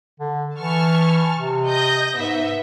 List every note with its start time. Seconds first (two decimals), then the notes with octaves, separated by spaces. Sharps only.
0.20 D3
0.59 E3 A5 C#6 F6
1.37 C3
1.67 D#5 G6 A#6
2.16 G#2 B3 E5